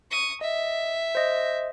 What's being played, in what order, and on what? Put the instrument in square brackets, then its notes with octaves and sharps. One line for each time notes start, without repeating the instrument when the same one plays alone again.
[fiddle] C#6 D#6
[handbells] D#5 [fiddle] E5
[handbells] C5 D#5